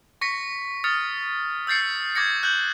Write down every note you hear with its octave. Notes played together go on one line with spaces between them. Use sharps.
C#6 A#6 B6 C#7
D#6 F6 A6 C#7
E6 G6 A6 C7 C#7
D6 G#6 A#6 C#7
F#6 G6 F#7